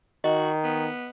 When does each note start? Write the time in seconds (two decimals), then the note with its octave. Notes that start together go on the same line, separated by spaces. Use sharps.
0.24 D#3 F#4 D#5
0.64 B3